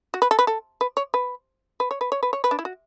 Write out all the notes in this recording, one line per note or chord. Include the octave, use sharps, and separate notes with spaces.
F#4
B4
A4
B4
A4
B4
C#5
B4
B4
C#5
B4
C#5
B4
C#5
B4
D4
E4
F#4